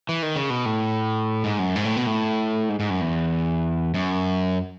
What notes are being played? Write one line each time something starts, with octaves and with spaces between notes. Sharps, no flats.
E3
D#3
C#3
B2
A2
G#2
F#2
G#2
A2
B2
A2
G#2
G#2
F#2
E2
F#2